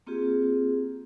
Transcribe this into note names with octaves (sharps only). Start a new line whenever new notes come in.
A#3 C4 F4 G4 G#4